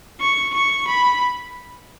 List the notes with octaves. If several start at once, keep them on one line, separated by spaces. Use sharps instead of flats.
C#6
C#6
B5